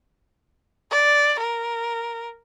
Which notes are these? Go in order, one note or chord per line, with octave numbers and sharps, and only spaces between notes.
D5
A#4